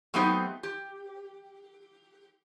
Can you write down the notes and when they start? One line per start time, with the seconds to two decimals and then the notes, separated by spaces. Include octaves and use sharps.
0.14 F#3 A3 B3 C4 D#4 G4
0.63 G4